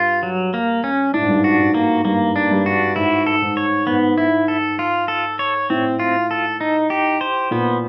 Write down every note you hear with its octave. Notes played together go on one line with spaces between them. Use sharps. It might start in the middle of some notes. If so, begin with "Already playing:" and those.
Already playing: G2 F4
F#3
A#3
C#4
A2 D4
G#2
G2
G#2
F#4
G#2
A#3
G2 A#3
D4
G2
F#4
G#2 E4
A4
G#2
C#5
G#2 B3
E4
A4
F4
A4
C#5
A2 C4
F4
A4
D#4
G4
C5
A#2 B3